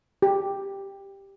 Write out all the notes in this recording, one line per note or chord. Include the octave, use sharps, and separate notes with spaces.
G4